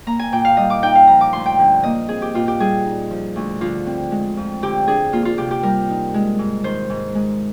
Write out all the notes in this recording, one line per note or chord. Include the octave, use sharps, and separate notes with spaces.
A#3 A#5
G#5
A#2 G5
F5
G3 D#5
D6
D#4 G5
F5
F3 A#5
D6
D2 C6
G5
D3
A#3 D#5
C4 G#4
G4
A#2 F4
G4
G3 G#4
D#4
F3
D2
D3 F4
C4
G#3
F2
D3 G4
D4 G#4
A#3 F4
F4
C3 G4
G4
G3 A#4
D#4
G#3
G#2
D#3 C5
G#2
G#3